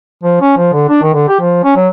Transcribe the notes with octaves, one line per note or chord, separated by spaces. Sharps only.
F3
C#4
F3
D3
D4
D#3
D3
G4
F3
C#4
F#3